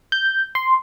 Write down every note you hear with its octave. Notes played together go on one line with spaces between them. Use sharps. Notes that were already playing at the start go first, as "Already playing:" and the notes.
G6
C6